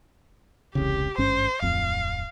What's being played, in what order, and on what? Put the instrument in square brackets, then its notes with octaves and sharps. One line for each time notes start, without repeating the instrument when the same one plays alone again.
[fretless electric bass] E1 C2 C#3 [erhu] G4
[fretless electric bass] G#1 G2 C#4 [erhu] C5
[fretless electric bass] D1 F2 [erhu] F5